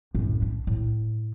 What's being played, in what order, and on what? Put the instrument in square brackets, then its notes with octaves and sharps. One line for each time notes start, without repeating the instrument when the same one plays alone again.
[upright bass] F#2 A2
D4
A2